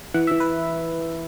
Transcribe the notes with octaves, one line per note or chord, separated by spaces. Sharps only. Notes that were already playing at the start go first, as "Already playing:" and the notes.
E3 F#5
E5
E3
B4